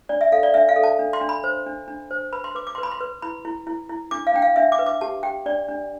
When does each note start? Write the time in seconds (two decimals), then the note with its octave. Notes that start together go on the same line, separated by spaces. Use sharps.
0.09 D4 D5
0.21 E5
0.32 A4 F5
0.43 D5
0.54 D4 E5
0.69 F5
0.76 A4
0.83 A5
0.99 D4
1.13 C6
1.21 D4
1.29 B5
1.44 C5
1.66 D4
1.88 D4
2.11 C5
2.33 B4 B5
2.44 C6
2.55 B4 D6
2.67 D6
2.75 B4 C6
2.83 B5
2.91 C6
3.01 B4
3.22 E4 B5
3.45 E4
3.67 E4
3.89 E4
4.11 D4 D6
4.27 F5
4.34 D4 G5
4.42 F5
4.56 D4 E5
4.72 D6
4.79 B4
4.86 D6
5.01 G4 A5
5.23 G4 G5
5.46 D4 D5
5.68 D4